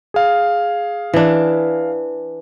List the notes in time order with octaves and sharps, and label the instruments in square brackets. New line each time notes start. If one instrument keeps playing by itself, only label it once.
[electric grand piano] G#4 F5
[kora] E3 D4